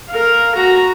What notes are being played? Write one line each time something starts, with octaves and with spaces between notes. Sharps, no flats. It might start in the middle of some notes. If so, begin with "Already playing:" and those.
A#4 F5
F#4 A#5